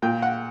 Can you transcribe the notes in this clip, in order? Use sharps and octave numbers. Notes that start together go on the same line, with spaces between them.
A#2 G5
F#5